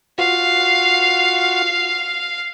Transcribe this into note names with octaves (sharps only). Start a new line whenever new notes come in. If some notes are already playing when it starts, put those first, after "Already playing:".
F4 F#4 F5